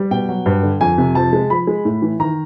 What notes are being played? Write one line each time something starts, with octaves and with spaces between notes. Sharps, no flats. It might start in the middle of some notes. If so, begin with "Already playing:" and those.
Already playing: G3
B2 G5
F#3
G2
D3
F2 G#5
C3
F3 A5
G#3
F3 B5
G#3
A2
E3
D#3 A#5